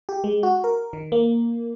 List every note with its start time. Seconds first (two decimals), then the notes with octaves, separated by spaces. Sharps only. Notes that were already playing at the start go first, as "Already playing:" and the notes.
0.09 G4
0.24 G#3
0.43 F#4
0.64 A#4
0.93 D#3
1.12 A#3